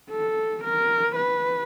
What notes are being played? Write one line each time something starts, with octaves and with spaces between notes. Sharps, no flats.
A4
A#4
B4